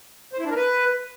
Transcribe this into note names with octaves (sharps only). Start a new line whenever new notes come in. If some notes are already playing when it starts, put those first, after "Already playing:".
C5
E4
D4
A#4
B4